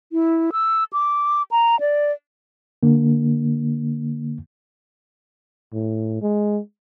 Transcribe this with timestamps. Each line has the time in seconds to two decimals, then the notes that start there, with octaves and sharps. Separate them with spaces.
0.12 E4
0.52 E6
0.93 D6
1.51 A#5
1.80 D5
2.83 D3 A#3
5.73 A2
6.22 G#3